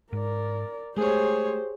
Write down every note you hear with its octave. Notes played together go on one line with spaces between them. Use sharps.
G#2 A#4 D5
G#3 A3 G4 G#4 C5 C#5